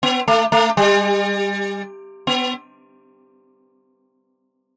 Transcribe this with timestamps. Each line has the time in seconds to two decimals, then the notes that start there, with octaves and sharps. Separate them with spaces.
0.03 B3
0.28 A3
0.52 A3
0.77 G3
2.27 B3